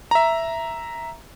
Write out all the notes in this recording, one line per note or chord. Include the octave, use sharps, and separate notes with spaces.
E5 A#5